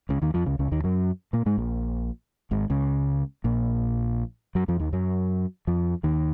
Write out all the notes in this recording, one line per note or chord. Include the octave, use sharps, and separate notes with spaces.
C#2 C#3
D#2 D#3
F2 F3
C#2 C#3
C#2 C#3
D#2 D#3
F#2 F#3
A#2 A#3
G#2 G#3
A#1 A#2
G#1 G#2
C#2 C#3
A#1 A#2
F#2 F#3
F2 F3
D#2 D#3
F#2 F#3
F2 F3
D#2 D#3